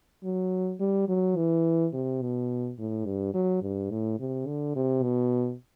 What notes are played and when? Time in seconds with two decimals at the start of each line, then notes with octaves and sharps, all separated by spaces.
0.24 F#3
0.80 G3
1.08 F#3
1.37 E3
1.93 C3
2.22 B2
2.79 A2
3.06 G2
3.34 F#3
3.62 G2
3.91 A2
4.20 C3
4.47 D3
4.76 C3
5.03 B2